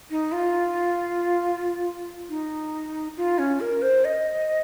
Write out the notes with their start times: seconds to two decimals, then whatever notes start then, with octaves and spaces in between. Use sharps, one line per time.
0.11 D#4
0.32 F4
2.29 D#4
3.17 F4
3.39 C#4
3.60 A#4
3.82 C5
4.05 D#5